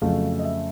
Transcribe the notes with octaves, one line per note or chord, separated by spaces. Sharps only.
F2 C#3 F#3 A3 F5
D#5
E5